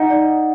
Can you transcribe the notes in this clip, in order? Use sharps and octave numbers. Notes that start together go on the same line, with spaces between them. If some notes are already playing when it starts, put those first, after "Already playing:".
Already playing: D#4 F#5
D5